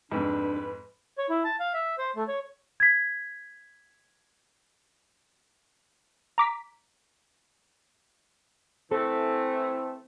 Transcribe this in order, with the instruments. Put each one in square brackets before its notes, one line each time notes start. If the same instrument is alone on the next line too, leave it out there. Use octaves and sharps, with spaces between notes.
[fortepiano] F2 G#2 [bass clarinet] D4 [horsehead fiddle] B4
[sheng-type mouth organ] C#5
E4
A5
F5
E5
C5
A3
C#5
[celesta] G#6 B6
[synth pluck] A#5 D6 B6
[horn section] E3 A3 [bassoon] C4 [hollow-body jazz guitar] A4